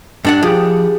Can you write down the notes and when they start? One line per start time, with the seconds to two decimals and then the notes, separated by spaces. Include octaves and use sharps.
0.25 G2 D4 F#5
0.43 F3 G4 G#4